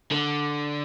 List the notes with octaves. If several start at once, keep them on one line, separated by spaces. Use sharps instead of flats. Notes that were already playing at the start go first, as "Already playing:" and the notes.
D3